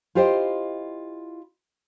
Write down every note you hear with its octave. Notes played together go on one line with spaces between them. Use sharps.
E4 F4 G4 C5 D#5 G5